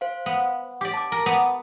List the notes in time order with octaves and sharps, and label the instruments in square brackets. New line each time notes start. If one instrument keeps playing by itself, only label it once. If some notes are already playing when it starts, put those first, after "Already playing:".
[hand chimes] C5 F5
[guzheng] B3
[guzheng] G4 D5 [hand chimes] D6
[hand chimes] A5 D6
[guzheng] A#4 [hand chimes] A5
[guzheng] B3